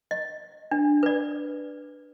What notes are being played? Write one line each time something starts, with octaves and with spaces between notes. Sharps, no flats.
D#5
D4
B4 D5